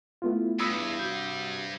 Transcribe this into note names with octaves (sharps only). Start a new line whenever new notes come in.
A3 B3 E4 F4
E2 G2 B5 D#6 E6
C3 F#4 G6